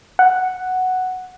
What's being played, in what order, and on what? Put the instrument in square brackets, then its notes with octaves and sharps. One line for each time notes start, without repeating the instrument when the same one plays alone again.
[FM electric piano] F#5